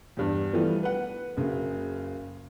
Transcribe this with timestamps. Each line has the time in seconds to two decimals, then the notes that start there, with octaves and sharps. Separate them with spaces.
0.17 E2 G2
0.53 E3 F3 G3 A3 B3
0.83 B4 F#5
1.37 F#1 C#3